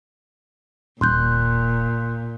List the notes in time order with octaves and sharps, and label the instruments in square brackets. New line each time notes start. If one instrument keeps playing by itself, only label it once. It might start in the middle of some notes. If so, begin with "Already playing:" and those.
[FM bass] D#1 [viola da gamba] A#2 [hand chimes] C6 F#6 G6